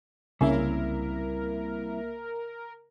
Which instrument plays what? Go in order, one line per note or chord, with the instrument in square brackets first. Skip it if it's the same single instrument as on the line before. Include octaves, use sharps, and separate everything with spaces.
[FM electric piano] C2 A#3 E5 [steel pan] C#3 [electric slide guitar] G3 C4 E4 [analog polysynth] A#4